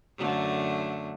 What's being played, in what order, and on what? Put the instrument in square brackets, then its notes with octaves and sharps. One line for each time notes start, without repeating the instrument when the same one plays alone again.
[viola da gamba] F#2 D3 A3